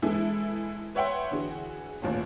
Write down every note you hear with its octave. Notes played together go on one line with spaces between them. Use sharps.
E3 G#3 E4 A4
B4 C#5 E5 F#5 G5 C6
D3 E3 F#4 G#4
A1 D#2 A#2